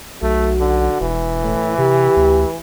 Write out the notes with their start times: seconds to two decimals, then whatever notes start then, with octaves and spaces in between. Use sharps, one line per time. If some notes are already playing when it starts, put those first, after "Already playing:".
0.22 B1 A3 F#4
0.60 D3
1.01 E1 E3
1.43 A2
1.78 C3 G4
2.16 D2